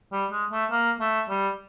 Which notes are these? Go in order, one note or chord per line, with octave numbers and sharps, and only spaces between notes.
G3
G#3
A3
A#3
A3
G3